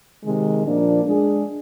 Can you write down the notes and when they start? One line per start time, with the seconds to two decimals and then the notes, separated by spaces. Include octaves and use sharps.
0.23 C3 D#3 G#3
0.64 A#2 F3 A#3 D4
1.04 G#3 D4 G#4